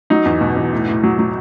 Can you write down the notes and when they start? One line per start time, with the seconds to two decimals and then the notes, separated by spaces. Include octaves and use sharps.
0.10 F#3 D#4
0.25 E2
0.41 B2
0.56 E2
0.73 A2
0.88 A2
1.03 F#3
1.19 F#3